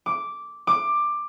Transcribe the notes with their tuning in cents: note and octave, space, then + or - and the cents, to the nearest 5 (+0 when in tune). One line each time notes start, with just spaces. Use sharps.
D6 -5
D6 +15